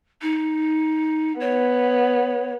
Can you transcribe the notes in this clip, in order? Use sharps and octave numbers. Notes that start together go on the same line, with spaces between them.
D#4
B3 C#5